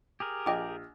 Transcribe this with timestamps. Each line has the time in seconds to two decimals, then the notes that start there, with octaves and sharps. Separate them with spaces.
0.20 G4 G#4 A#4
0.46 A#1 D#5 G5 D6